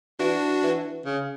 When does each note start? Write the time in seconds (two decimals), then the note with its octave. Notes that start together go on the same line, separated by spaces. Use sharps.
0.19 E3 D4 F#4
0.63 E3
1.05 C#3